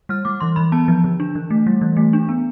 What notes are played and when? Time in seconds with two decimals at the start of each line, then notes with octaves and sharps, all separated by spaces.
0.09 G3 F6
0.25 G3 D6
0.40 E3 C6
0.56 E3 B5
0.72 B3 A5
0.88 F3
1.04 D3
1.20 D4
1.35 E3
1.50 A3
1.67 G3
1.81 E3
1.97 A3
2.13 D4
2.29 B3